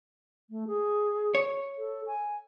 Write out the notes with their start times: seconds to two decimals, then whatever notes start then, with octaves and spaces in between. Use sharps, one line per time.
0.50 A3
0.67 G#4
1.35 C#5
1.78 A4
2.07 G#5